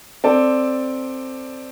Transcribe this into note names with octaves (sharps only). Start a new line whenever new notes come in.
C4 A4 D5